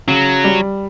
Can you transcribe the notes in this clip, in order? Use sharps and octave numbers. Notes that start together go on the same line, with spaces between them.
C#3 F#3
G3